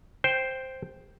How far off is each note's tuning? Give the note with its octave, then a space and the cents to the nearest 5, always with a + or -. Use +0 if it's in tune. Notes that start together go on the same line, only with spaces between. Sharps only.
C5 +0 G5 +0